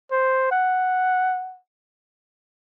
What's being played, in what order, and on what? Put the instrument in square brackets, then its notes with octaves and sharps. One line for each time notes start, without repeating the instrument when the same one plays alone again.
[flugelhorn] C5
F#5